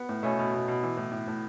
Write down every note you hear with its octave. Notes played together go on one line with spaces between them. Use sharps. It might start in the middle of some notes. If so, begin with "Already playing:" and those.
Already playing: B3
A2
B2 A3 C#4
B2
B2
B2
E3
A2
A2
A2